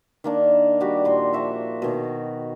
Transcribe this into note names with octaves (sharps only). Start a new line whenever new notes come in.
D#3 A#3 D4
G3 F#4 G4
A#2 F#4 C6
F3 F#4 E5
B2 D#3